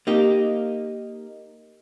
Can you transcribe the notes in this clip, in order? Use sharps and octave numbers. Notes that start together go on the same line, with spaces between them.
A#3 D#4 G4